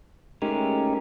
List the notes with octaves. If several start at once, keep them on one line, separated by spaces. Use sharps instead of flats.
G#3 A3 C#4 D#4 G4 A#4